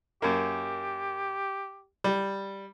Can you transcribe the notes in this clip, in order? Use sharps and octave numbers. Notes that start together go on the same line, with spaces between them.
F#2 A#3 G4
G3